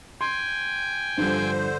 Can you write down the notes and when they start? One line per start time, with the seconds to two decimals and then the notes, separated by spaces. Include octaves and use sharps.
0.21 G5 G#5 C6
1.18 G2 D3 F3 G3 C5